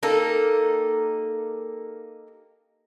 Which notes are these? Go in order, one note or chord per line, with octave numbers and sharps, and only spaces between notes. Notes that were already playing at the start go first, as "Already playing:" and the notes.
A#3 D#4 G4 A4